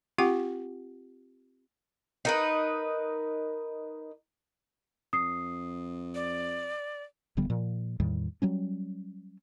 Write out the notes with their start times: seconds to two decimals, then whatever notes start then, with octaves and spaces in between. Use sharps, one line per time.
0.18 C4 F4 G4 F#5 D6
2.25 D#4 A#4 B4
5.13 F2 D#6 C7
6.15 D5
7.37 D1 D3 G3 B3
7.50 A#2 F3
8.00 E2 A2 D#3 G3
8.42 F#3 G3 C#4